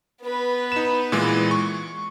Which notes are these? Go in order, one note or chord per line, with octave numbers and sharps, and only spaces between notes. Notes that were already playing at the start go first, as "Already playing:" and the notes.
B3 B4
D#4 E7
A#2 E3 G#3
C#6